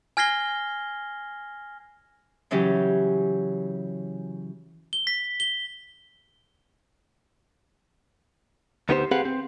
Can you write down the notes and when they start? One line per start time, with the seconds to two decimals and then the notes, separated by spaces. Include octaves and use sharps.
0.17 G#5 F6 G#6 A#6 C7 G7
2.51 C#3 E3 F#3 C#4 G4
4.93 G7
5.07 B6
5.40 G7
8.89 D2 B3 D#4 G4 G#4 C5
9.11 C4 G4 G#4 B4 F5 F#5
9.25 C4